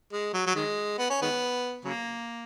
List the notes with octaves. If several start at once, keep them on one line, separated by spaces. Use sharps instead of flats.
G#3
F#3
F#3
D#3 G#3
B3
C#4
D#3 G#3 B3
C#3 F#3 A#3